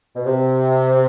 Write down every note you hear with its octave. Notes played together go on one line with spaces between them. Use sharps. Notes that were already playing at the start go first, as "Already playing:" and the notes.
B2
C3